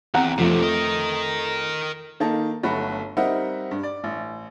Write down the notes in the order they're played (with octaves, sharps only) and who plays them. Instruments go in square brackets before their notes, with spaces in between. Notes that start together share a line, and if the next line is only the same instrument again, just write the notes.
[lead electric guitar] E2 [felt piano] C4 F#5 A#5
[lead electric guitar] B1 C3 [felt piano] F2 F3 A3
[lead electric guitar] A#4 D#5
[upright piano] D#3 A#3 D#4 A4
G1 F#3 A3 F#4 B5
G3 C4 D#4 A#4 E5 F#5
G2
D5
A1